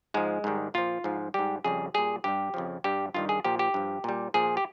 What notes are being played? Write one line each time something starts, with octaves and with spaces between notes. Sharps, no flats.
G#2 F3 G#3
G#2 D#3 G3
A#2 F3 F4
G#2 F3
G#2 G3 G4
F2 C#3 G3 G#4
A#2 G3 G#4
G2 G3 G4
F2 C#3 F3
G2 G3 G4
G2 D#3 G3 F4
G#4
A#2 F3 G4
G4
G2 F3
A#2 G3
A#2 F3 G#4
G4